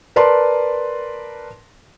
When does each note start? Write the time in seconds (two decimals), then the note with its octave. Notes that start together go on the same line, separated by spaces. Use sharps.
0.16 A#4 B4 D5 A5 C6